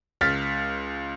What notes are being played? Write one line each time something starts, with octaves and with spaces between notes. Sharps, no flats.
C#2 F6 A6 B6